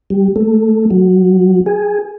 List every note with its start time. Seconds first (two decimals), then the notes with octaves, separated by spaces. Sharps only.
0.10 G3
0.36 A3
0.90 F#3
1.66 G#4